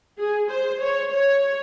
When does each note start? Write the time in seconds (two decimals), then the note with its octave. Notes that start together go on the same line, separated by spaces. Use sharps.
0.18 G#4
0.50 C5
0.80 C#5
1.11 C#5